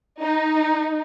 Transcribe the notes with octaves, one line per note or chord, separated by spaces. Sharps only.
D#4